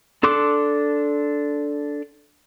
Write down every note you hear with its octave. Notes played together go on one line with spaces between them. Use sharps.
D4 A4 C6 D6 F#6